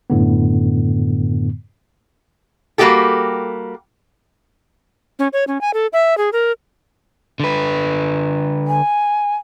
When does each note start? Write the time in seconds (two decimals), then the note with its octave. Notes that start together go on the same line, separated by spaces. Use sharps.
0.10 F#2 A2 D3 B3
2.78 G3 A#3 B3 F#4 G4 A4
5.19 C#4
5.33 C#5
5.47 C#4
5.61 G#5
5.74 A4
5.93 E5
6.18 G#4
6.33 A#4
7.40 D3 B4
8.67 G#5